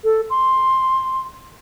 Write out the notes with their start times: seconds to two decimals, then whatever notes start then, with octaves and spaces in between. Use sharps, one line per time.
0.04 A4
0.30 C6